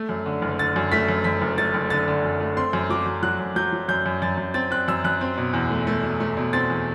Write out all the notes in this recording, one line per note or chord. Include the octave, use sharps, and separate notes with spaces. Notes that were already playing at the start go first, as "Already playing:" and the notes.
Already playing: A3
F#2
D3
F#1
D3 A6
F#2
A3 B6
F#2
F#2 B6
F#1
A3 A6
F#1
D3 A6
D3
F#2
A3
C4 C6
F#2
F#3 D6
F#2
F#3 F#6
F#2
F#3 G6
F#3
F#2 G6
F#2
F#2 A6
F#2
C4 A6
C4 F#6
F#2 E6
F#2 F#6
C4
B2
E2
A3
A3
B2
A3
B2
C4 A6
E2